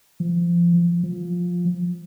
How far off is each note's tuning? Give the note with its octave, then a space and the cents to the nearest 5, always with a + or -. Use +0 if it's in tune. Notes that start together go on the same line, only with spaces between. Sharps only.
F3 -20
F3 +10